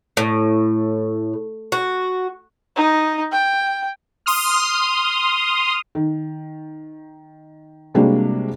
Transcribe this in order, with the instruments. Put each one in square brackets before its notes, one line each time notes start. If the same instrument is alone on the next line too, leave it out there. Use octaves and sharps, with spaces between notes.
[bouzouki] A2
F#4
[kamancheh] D#4
G5
[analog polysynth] C6 D#6 F6
[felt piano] D#3
C3 G3 G#3 A#3 D4 F#4